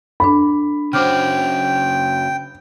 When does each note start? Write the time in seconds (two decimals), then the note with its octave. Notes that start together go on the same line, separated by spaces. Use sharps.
0.20 D4 A4 B5
0.93 C#3 C#4 F#4 C5 G5 D6 F6